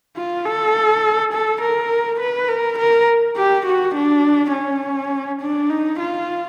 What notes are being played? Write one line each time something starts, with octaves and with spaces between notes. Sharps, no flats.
F4
A4
A4
A#4
B4
A#4
A#4
G4
F#4
D4
C#4
D4
D#4
F4